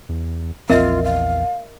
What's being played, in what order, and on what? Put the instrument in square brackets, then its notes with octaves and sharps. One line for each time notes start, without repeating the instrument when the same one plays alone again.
[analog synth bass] E2
[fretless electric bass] A#1 C4 [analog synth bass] E2 [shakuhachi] F4 [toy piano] A#4 D#5 E5
[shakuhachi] F5